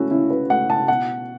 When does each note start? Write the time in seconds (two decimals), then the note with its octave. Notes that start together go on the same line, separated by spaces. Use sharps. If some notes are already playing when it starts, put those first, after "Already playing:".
Already playing: A3 C#4 E4 F#4
0.11 C#3 E4
0.30 B4
0.50 A3 F#5
0.70 A5
0.88 B2 F#5